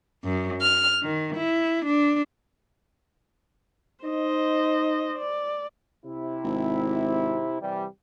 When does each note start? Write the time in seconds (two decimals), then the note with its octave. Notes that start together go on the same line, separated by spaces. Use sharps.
0.24 F#2
0.61 F6
1.03 D#3
1.37 E4
1.85 D4
4.04 D#4 C5 D#5
5.18 D5
6.06 C3 E4
6.44 G#1
7.61 C3 E3 G3